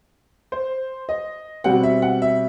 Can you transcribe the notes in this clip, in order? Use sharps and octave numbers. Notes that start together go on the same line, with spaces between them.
C5
D#5
B2 G3 C4 F#5
E5
F#5
E5